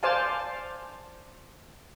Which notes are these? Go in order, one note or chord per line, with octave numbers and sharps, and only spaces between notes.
C5 D5 F5 G#5 A5